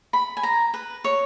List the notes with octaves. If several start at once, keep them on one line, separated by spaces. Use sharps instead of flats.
B5
G#5
A#5
B4
C#5